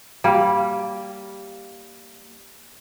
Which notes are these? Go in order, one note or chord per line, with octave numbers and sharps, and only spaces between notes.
G3 A#3